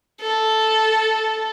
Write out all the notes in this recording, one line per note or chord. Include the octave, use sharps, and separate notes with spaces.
A4